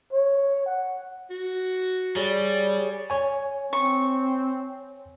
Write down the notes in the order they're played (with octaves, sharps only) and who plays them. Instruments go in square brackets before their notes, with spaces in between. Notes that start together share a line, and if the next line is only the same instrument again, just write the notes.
[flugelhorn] C#5
F#5
[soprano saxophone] F#4
[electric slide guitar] G3 [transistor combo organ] G#4 C#5 [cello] D5
[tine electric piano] C#5 G#5
[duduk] C4 [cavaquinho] C#6